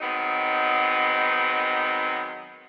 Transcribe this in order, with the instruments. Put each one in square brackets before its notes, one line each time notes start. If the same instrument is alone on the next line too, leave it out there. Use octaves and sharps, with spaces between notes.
[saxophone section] D#3 F#3 G#3 B3 C4 D#4